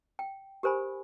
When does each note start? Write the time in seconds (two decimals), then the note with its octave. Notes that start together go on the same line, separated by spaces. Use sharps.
0.19 G5
0.63 G4 A#4 C5 G#5 B5